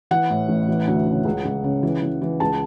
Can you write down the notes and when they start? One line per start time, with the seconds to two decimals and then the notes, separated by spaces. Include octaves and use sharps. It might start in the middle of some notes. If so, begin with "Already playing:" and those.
0.11 E3 F#5
0.30 A2
0.49 A1
0.69 E3
0.87 D2
1.06 C#3
1.25 C#2
1.45 C#2
1.64 C#3
1.83 E3
2.03 E3
2.22 E3
2.40 C#2 A5